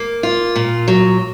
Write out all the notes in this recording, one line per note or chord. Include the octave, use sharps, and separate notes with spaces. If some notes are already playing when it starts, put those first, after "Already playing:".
Already playing: A#3
F4
A#2
F#3